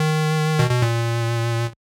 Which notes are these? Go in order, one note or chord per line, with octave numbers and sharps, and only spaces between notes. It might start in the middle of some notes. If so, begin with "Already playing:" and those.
Already playing: D#3
B2
B2
A#2